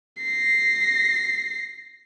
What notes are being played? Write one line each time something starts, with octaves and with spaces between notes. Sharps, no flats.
A#6 C7